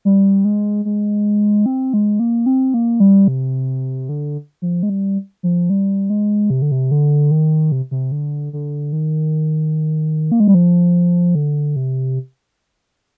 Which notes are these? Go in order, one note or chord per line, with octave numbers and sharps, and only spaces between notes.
G3
G#3
G#3
C4
G#3
A#3
C4
A#3
G3
C3
D3
F3
G#3
G3
F3
G3
G#3
C3
D3
C3
D3
D#3
C3
C3
D3
D3
D#3
A#3
G#3
G3
F3
D3
C3